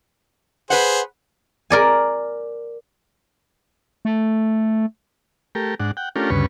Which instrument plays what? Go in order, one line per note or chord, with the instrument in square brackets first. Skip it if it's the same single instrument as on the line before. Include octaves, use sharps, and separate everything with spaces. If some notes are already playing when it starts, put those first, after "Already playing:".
[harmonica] G#4 C5 [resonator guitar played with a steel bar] B4 F#5
[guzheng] A#4 D5 G#5
[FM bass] A3
[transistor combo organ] A3 G4 A#4
G#2 D4 F#5
F#5 G5
A3 C#4 D4 F4 G4 A#4
D2 G2 C#3 B4 C#6